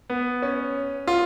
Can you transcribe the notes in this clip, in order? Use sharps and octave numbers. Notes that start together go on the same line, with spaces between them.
B3
C#4
F4